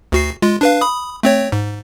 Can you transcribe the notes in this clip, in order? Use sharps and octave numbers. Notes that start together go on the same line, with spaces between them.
D2 F#4 C7
G#3 F4
D4 B4 F5
B5 D#6
A3 C4 C#5
G#2